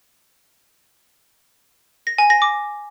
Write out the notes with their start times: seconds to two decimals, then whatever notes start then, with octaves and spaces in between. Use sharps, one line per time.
2.07 A#6
2.18 G#5
2.30 A#6
2.42 D6